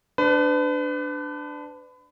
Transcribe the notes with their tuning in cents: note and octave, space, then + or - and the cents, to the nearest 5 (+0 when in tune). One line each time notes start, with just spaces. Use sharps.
D4 +5 B4 +35